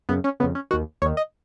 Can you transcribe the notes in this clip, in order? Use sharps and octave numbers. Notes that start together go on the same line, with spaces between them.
F#2 C#3 B3
C#4
F2 C#3 B3
C#4
D#2 D#3 F#4
D#2 D#3 C#5
D#5